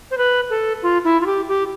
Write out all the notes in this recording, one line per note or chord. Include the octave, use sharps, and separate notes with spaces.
C5
B4
A4
F4
E4
F4
G4
G4